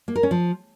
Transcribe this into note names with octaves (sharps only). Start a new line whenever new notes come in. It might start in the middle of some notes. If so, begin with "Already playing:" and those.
A#3
A#4
C#4
F3